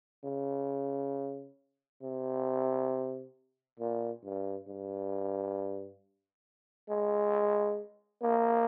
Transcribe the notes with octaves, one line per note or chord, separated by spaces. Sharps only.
C#3
C3
A#2
G2
G2
G#3
A#3